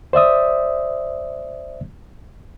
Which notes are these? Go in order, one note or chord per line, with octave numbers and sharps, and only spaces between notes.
C5 D5 E5 D#6